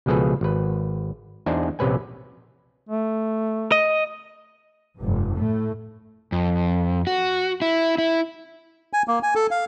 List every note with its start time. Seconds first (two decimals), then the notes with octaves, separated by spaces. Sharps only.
0.06 C#2 B2 F3 G#4 A4 B4
0.41 G#1 B4
1.46 E2 D4 D#4 C5 G#5
1.79 A#1 C3 C#4 B4 G#5
2.89 A3
3.72 D#5
4.99 F1 G2
5.36 A2 A3
6.32 F2
7.07 F#4
7.62 E4
7.98 E4
8.93 G#5
9.08 A#3
9.23 G#5
9.35 A4
9.51 F5